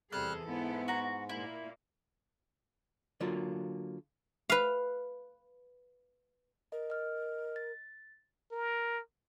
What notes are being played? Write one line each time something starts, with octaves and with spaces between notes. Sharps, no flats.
E2 C3 G3 G#4 A4 F6 F#6
G#2 B3 E4
F#4 A#5
A#2 A#3 E4
D3 F#3 A#3 F4
B4 F5
A#4 D#5
D#5 F6
A6
A#4